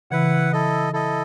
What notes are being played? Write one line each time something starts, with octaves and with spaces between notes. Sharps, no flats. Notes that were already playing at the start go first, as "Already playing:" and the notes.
C#3 E3 E4 B4 F#5
E4 A4 D#5
E4 A4 D#5